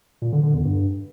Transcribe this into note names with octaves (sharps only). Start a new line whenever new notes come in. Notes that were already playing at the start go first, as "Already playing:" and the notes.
A#2
D3
D3
E2
G2